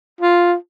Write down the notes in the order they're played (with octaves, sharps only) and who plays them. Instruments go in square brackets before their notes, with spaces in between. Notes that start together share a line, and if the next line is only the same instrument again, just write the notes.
[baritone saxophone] F4